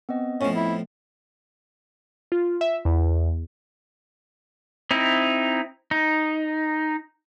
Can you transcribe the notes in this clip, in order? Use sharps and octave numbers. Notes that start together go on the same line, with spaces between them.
B3 C4 D#5
A2 F3 C#4
E4
F4
E5
E2
C4 D#4 E4
D#4